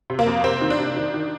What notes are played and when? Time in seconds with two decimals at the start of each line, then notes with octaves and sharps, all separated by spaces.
0.10 C3
0.19 A#3
0.27 F2
0.44 C3 C4
0.61 D#3
0.70 D4
0.78 C3
0.96 D#3
1.14 D#3